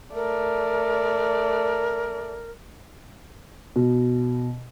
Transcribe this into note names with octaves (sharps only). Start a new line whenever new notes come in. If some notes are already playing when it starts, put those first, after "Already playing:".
A3 A#4 D5
B2